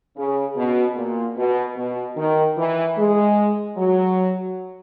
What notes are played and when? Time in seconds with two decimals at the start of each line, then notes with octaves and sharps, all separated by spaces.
0.17 C#3
0.57 B2
0.97 A#2
1.37 B2
1.77 B2
2.16 D#3
2.58 E3
2.97 G#3
3.77 F#3